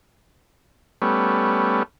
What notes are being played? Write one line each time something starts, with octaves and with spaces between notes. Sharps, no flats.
G3 A3 B3 C#4